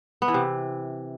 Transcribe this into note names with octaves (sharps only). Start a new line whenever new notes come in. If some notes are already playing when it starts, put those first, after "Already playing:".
B3
E3
C3